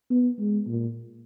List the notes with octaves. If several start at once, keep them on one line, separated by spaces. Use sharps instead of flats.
B3
G#3
A#2